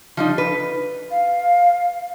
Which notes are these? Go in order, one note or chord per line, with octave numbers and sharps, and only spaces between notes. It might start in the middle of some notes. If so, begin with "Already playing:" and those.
F3 G3 D#4
B4
F5